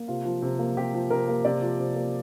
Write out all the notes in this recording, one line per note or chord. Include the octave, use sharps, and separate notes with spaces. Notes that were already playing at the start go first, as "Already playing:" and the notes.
Already playing: A#3
C3 F4
F3
C3
A#3
C3 G4
F3
C3 A#4
A#3
C3 D5
F3
C3
A#3